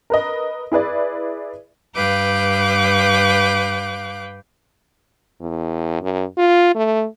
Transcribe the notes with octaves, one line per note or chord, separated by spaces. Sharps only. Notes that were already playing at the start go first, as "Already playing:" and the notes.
A#4 B4 D#5
E4 G#4 B4 D5
G2 B4 F5 G5 D6 F#6
E2
F#2
F4
A3